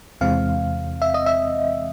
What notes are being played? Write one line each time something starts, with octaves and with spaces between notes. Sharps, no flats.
E2 C3 E3 G#3 C4 F5
E5
D#5
E5